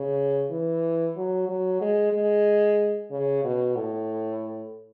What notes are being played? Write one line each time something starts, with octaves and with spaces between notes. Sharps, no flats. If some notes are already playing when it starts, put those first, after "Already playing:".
Already playing: C#3
E3
F#3
F#3
G#3
G#3
C#3
B2
A2